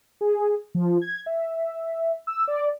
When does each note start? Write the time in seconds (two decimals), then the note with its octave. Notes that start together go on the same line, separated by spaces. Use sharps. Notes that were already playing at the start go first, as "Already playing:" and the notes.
0.21 G#4
0.75 F3
1.02 G#6
1.26 E5
2.27 E6
2.48 D5